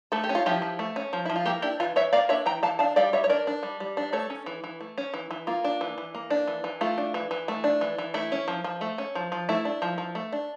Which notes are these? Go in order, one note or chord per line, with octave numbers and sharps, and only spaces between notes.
A3 A4
G4
C#4
F4
F3 E4 G4
F3
A3
C#4
F3
F3 E4
F4
A#3 E4 G4
D4 E4 G4
E3 F4
E3 C#5 E5
A#3 D5 F5
D4 C#5 E5
E3 G5 A#5
E3 F5 A5
D4 F5 A5
G3 D5 F5
G3 C#5 E5
C#5
D4 A#4 D5
D4
G3
G3
D4
A3 A4 C#5
C#4
E3
E3
A3
C#4
E3
E3
A#3 F4
D4
E3
E3
A#3
D4
E3
E3
A3 F4
D4
E3
E3
A3
D4
E3
E3
A3 E4
C#4
F3
F3
A3
C#4
F3
F3
A3 E4
D4
F3
F3
A3
D4